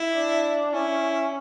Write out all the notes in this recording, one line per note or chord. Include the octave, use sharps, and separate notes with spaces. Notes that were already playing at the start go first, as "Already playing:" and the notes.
Already playing: E4
D4
C#4 E4